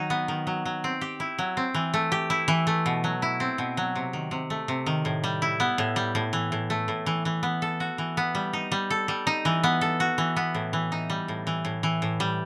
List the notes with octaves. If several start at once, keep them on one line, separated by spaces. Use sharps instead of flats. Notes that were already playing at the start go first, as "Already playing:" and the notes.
Already playing: D#3 F#3 D#4
B3
D#3
F#3
F#3
C4
G4
E4
F#3
C4
E3
A3
G4
E4
E3
A3
B2
F#3
E4
C4
B2
F#3
C3
D#3
C3
A3
C3
D#3
A2
G3
E4
B3
A2
G3
A2
E3
A2
A3
A2
E3
E3
B3
A4
F#4
E3
B3
G3
D#4
G3
A4
G3
D#4
E3
B3
A4
F#4
E3
B3
A2
E3
D#4
G3
A2
E3
A2
E3
A2
G3